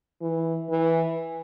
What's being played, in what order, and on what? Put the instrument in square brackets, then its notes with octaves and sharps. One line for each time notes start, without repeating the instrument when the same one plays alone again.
[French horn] E3
E3